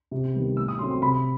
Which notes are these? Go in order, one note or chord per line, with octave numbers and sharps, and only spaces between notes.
C3
D#3 G3 B3
A2 E6
D#6
F#3 A3 C4 C6
C6
C3 B5